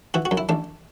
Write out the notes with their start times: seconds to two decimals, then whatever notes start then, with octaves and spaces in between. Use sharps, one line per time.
0.14 E3 F#4
0.25 F#4
0.31 F#2
0.37 E4
0.49 A1 D4